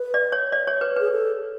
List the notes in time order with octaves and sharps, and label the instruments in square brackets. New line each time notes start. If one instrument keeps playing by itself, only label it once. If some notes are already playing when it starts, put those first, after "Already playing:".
Already playing: [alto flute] B4
[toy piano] D5
C#5
D5
C#5
B4
[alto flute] G#4 [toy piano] B4
[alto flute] A4